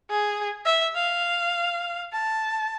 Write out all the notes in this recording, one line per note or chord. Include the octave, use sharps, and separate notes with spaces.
G#4
E5
F5
A5